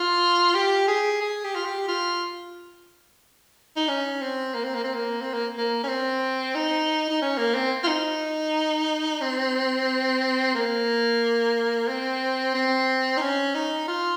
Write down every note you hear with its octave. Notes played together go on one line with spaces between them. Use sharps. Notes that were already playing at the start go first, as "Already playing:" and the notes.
Already playing: F4
G4
G#4
G#4
G4
F4
G4
F4
D#4
C#4
C4
A#3
C4
A#3
C4
A#3
C4
A#3
A#3
C#4
C4
D#4
D#4
C#4
A#3
C4
F4
D#4
C4
A#3
C4
C4
D#4
C#4
D#4
F4